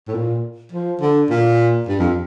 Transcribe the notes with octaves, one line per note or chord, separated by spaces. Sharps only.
A2
A#2
F3
D3
A#2
G2
F2